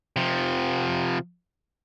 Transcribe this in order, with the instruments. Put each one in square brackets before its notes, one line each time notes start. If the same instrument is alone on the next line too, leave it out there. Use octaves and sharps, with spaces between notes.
[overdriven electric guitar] C3 F3